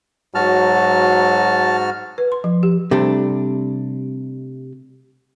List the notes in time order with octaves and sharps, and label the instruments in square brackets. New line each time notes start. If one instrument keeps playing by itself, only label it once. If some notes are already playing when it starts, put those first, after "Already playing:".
[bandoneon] G#2 F#4 F6 [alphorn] F#3 [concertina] A5
[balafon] B4
C6
F3
G4
[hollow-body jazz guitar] C3 G3 A3 D4